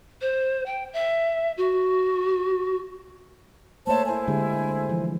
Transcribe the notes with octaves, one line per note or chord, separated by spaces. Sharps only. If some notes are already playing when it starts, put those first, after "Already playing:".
C5
G5
E5
F#4
A3 A#3 C5 C#5 E5 A5
E4 C5 G#5
D3 G#3 G4
E3 F3